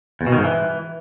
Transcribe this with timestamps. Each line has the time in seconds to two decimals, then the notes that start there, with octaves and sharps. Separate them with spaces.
0.21 E2
0.27 B2
0.32 D#3
0.38 G#2
0.44 E3